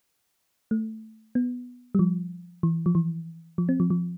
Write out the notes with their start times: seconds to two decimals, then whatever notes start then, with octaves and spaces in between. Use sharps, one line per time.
0.71 A3
1.35 B3
1.95 G3
1.99 F3
2.63 E3
2.86 F3
2.95 E3
3.58 F3
3.69 C4
3.80 F3
3.90 F3